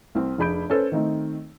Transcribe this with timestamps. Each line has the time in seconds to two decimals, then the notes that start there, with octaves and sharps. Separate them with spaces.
0.15 C2 C4
0.38 F1 D4 G#4 B5 G6 D7
0.70 C#4 A4 B4 C5
0.92 D#3 A3 C4 D#4